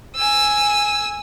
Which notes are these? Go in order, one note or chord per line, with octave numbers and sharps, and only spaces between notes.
G#5 E6